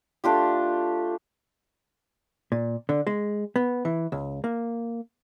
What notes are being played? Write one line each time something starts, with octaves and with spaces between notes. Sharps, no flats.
A3 D4 F4 G4
A#2
D3
G#3
B3
E3
C#2
A#3